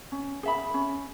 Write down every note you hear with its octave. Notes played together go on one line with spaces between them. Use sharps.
C#4
G#4 E5 B5
C#4